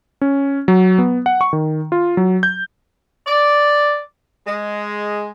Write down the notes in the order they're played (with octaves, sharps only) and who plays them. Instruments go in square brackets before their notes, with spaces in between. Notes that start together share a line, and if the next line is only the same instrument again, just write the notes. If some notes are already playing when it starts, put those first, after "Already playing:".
[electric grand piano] C#4
F#3
B3
F#5
C#6
D#3
F4
F#3
G6
[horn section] D5
G#3